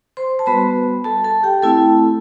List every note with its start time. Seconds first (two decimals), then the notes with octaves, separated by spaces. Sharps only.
0.17 C5 C6
0.39 A5
0.46 G3 B3 F#4 B4 B5
1.04 A4 A5
1.24 A4 A5
1.43 G4 G5
1.62 A3 C4 E4 A4 A5